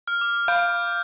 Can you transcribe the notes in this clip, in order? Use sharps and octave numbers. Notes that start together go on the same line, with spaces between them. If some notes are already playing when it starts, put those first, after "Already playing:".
F6
D6
F5 G6